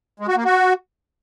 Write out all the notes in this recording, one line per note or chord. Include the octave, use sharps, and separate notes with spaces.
G#3
F#4
A#3
F#4